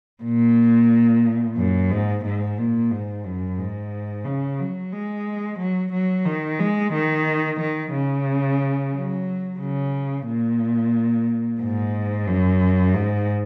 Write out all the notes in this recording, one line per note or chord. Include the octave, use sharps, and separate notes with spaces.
A#2
F#2
G#2
G#2
A#2
G#2
F#2
G#2
C#3
F#3
G#3
F#3
F#3
D#3
G#3
D#3
D#3
C#3
F#3
C#3
A#2
G#2
F#2
G#2